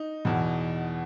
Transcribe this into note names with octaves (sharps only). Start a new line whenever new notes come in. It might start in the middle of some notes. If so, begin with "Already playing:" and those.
Already playing: D#4
E2 B2